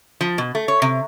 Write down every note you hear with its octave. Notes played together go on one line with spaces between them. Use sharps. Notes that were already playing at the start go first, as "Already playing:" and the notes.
F3
B2
A3
C#5
C3